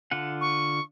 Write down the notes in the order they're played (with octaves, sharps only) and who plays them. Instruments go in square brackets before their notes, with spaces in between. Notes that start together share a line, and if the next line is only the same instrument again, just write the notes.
[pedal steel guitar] D3 F4 F#5
[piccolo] C#6